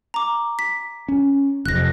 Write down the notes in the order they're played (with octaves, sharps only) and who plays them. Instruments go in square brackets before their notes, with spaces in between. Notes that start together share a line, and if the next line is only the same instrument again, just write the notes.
[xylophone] A#5 D6
B6
[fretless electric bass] C#4
[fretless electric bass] F1 F2 [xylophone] F#6 A#6